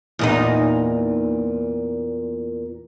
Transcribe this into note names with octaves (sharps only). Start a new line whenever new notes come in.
E2 A#2 D#4